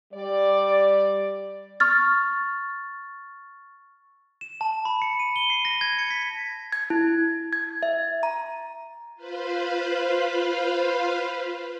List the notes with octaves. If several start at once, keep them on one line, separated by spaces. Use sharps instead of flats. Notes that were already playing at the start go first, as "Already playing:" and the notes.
G3 D5
C#6 F6 A6
E7
A5
B5
C#7
D#7
G7
C7
A#6
G#6
C#7
B6
G#6
E4
G#6
E5
A#5
F4 B4 C5 F5 B5